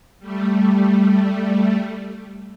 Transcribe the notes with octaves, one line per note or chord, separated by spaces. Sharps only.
G3 A3